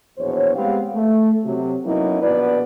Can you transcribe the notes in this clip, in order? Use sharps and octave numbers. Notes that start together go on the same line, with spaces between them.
A#1 E2 B2 C5 C#5
G#3 B3 C4 G4 F5
A3
C3 F#3
F#3 A#3 B3 C#4 D#4 E4
A#1 B2 B3 B4 D5